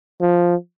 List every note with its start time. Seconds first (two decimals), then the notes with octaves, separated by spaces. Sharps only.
0.21 F3